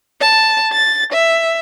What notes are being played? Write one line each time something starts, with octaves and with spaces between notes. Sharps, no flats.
A5
A6
E5